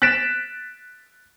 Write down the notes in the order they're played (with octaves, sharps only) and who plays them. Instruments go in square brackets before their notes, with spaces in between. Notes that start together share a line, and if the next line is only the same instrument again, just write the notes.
[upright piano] F#6 A6 B6 D7 E7